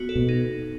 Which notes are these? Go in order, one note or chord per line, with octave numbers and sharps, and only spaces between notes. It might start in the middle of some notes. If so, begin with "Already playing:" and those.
Already playing: B3 F#4
A4
B2
D#4